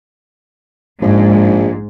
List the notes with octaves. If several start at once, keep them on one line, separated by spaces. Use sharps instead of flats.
A#1 G#2